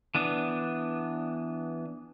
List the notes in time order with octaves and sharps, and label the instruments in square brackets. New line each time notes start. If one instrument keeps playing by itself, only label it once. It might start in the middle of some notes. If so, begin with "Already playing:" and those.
[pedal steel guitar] E3 B3 D4